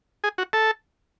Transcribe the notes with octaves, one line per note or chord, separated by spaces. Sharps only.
G#4
F#4
A4